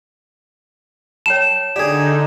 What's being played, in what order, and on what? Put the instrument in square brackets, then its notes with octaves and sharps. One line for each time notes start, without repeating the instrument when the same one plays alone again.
[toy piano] C#5 G5 A5 [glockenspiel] E7
[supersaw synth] D3 D#4 [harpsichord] G4 G#4 [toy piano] D5